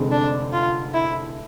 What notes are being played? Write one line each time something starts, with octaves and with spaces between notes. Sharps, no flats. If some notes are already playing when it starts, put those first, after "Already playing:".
Already playing: F1 F2 D3 G#3 C4
D4
F4
E4